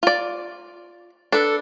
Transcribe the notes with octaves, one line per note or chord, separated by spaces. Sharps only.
F4 D5
D4 A4 B4